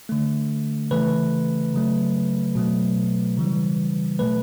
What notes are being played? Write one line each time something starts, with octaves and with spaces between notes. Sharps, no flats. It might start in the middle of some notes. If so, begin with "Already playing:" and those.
D3 A3
C#3 E3 A3 B4
C#3 F#3 A3
B2 F#3 A3
C#3 E3 G3
B2 F#3 A3 B4